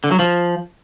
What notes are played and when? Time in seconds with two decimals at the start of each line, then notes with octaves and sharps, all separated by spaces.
0.04 D3
0.11 F#3
0.19 F3